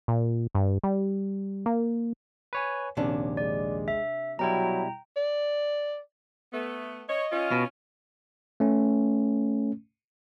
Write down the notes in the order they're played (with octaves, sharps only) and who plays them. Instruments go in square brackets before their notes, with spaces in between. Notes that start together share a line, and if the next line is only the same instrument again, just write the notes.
[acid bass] A#2
G2
G3
A#3
[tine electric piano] B4 C#5 G#5
[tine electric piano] A#1 D#2 [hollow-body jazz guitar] C3 C#4 D4
[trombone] G#3 [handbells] D5
[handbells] E5
[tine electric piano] B2 G3 E4 [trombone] F#3 [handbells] G5 A#5
[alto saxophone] D5
[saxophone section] A3 B3
[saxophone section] C#5 [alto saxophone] D#5
[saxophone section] C#4 F4
[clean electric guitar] B2
[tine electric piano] A3 C#4